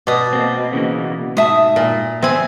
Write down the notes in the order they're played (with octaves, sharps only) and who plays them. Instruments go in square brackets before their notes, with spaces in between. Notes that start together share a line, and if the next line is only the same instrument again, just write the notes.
[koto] B2 [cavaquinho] D5 D#6
[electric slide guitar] A#3 C4
C#3 E3 A#3
[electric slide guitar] G#2 A5 [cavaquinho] E5 D#6
[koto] A#2
[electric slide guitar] F2 B3 E5 [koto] C4 G#5